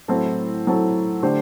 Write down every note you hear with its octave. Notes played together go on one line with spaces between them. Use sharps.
A2 F#3 C4 E4 A4
A2 F#3 C4 E4 A4
D3 A3 D4 G4 C5